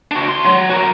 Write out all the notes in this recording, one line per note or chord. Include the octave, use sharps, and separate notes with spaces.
D4 F#4
D2 C6
F#3
F#4 A#4